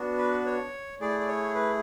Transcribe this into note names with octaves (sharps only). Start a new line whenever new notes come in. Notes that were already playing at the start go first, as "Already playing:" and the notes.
Already playing: B3 D4 F#4
B4
C#5
A3 E4 G#4 D5
D5
C#5
B4